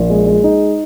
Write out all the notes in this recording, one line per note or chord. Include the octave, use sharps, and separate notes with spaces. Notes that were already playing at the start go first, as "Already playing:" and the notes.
Already playing: A#1
G#3
G#3
D#4